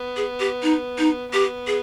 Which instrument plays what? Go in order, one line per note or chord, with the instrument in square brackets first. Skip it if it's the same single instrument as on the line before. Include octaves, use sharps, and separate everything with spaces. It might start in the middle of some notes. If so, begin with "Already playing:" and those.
Already playing: [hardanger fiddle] B3
[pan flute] G#4
G4
D#4
D#4
[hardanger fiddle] B3 [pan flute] G4
[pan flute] G#4